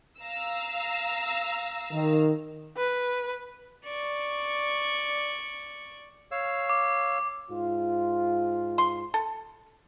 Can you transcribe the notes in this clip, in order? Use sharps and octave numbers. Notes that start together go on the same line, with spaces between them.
F5 A#5 E6
D#3
B4
D5 C#6
C#5 F5 E6
D6
G#2 F4
C6
A4